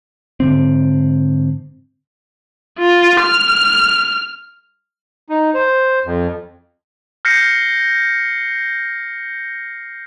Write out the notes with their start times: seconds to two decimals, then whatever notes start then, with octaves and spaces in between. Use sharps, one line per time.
0.40 G#2 D3 C4
2.79 F4
3.21 F6
5.29 D#4
5.54 C5
6.06 F2
7.25 F6 G6 A#6 C7 C#7